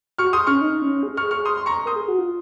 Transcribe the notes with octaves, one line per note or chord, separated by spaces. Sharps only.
F#4 C#6 F6
G#4 C6 D#6
C#4 C#6 F6
D#4
C#4
G#4
G#4 C#6 F6
G#4 C#6 F6
C6 D#6
C6
A#5 C#6
A#4 C6 D#6
G#4
F#4
F4